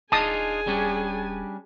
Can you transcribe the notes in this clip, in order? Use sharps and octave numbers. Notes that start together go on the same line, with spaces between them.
D#1 D4 D#4 F4 G#4 G#5 A5 D#6
G3 C#4 D4